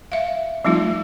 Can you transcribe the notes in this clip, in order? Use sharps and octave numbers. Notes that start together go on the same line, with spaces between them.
E5 F5
F3 G3 A3 C4 D#4 F4